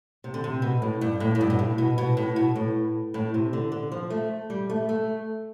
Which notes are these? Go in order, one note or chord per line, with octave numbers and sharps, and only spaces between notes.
C3
D3
C3
B2
A2
G2
A2
A2
G2
B2
A2
B2
B2
A2
B2
A2
A2
C3
D3
D3
F3
A3
G3
A3
A3